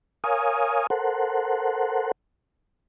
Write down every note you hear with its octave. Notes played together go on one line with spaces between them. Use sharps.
A#4 C#5 F5 G#5 D#6
A4 A#4 C5 F#5